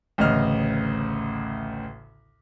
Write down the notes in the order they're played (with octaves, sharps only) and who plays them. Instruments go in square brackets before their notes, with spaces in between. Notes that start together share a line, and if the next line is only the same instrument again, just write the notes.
[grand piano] A1 D2 C#3 D#5 F6